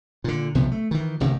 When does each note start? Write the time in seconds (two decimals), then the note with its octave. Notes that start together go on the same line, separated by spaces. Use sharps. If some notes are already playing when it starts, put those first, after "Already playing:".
0.24 A#2 D3
0.55 B1 C3 F3 B3
0.72 A3
0.91 D#3 E3
1.20 A1 G2 C3 D#3